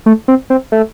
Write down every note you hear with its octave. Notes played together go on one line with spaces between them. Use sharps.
A3
C4
C4
A3